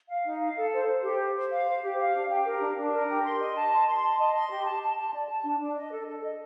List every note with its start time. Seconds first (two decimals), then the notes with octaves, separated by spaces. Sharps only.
0.09 F5
0.25 D#4
0.41 F5
0.56 A4
0.72 C5
0.87 C5
1.03 G4
1.19 C5
1.35 C5
1.50 F5
1.66 C5
1.82 G4
1.97 F5
2.14 D4
2.30 G4
2.45 A#4
2.60 D4
2.76 D4
2.93 A#4
3.08 G4
3.24 C6
3.40 D#5
3.55 A5
3.71 C6
3.87 C6
4.02 A5
4.19 D#5
4.34 C6
4.50 G4
4.65 A5
4.81 A5
4.97 A5
5.13 D5
5.29 A5
5.44 D4
5.60 D4
5.76 D#5
5.91 A4
6.07 A4
6.23 D#5